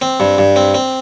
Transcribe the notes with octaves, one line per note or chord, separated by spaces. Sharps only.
C4
G2
G2
C4
C4